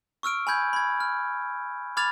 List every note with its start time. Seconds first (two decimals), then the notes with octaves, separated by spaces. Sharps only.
0.23 C#6 E6 F6 D7
0.47 G#5 B5 G6 G#6
0.73 B5 G#6
1.00 F6
1.97 B5 D6 F6 G#6 A6 F7